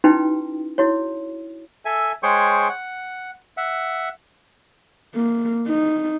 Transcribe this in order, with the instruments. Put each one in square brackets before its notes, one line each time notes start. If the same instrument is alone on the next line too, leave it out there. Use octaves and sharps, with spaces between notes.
[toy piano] C#4 D#4 E4 F#4 B4 G5
E4 F#4 C#5
[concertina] A4 E5 G#5
G#3 G#4 C5 C#5 G5 C#6
F#5
E5 F#5
[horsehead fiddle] A#3
D#4